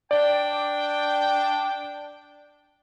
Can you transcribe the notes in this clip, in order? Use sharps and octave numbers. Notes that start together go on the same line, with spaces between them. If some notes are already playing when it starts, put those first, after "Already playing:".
D4 D5 G5